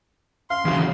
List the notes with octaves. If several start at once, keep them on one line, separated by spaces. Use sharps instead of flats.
F5 C6
D#2 C#3 E3 F#3